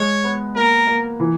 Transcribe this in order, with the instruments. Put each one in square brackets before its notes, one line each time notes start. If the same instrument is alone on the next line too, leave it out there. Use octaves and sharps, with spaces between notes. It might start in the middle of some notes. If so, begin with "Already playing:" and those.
Already playing: [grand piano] G#3 [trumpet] C#5
[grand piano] B3
[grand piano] A#3 [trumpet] A#4
[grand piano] A#3
E3